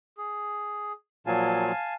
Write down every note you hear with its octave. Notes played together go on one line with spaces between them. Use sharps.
G#4
A#2 F3 F#3 F5 G#5 A5